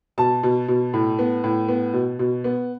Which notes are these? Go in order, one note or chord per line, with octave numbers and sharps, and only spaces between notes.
B2 A5
B2
B2
A2
B3
A2
B3
B2
B2
B3